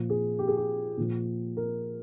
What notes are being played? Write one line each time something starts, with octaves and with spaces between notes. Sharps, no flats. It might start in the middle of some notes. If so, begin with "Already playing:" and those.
Already playing: A#2 F3
G#4
G4
G#4
G4
A#2 F3
A#4